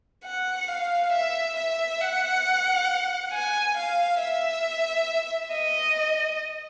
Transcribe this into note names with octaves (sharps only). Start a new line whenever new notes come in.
F#5
F5
E5
E5
F#5
G#5
F5
E5
D#5